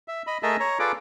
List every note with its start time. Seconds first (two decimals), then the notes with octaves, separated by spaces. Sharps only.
0.08 E5
0.27 D#5 B5
0.43 A3 G#4 A#4 D#5 E5 A5
0.60 C#5 A#5
0.79 F4 G#4 A4 B4 D5 D6